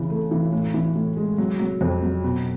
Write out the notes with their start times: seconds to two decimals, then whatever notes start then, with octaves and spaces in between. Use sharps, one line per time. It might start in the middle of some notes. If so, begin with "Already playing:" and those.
Already playing: C#3 E3
0.10 A3
0.31 E3
0.52 A2
0.74 E3
0.95 A2
1.17 G#3
1.38 F#3
1.60 F#3
1.81 F2
2.03 F#3
2.24 B2